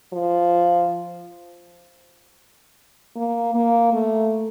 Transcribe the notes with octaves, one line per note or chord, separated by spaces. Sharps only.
F3
A#3
A#3
A3